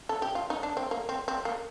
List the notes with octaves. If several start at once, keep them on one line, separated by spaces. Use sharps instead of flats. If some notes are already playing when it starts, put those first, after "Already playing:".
A4
G4
F4
D#4
D4
C4
A#3
C4
C4
A#3